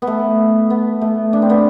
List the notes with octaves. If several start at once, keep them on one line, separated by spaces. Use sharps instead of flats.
B3
A3
B3
A3
D4
C4
B3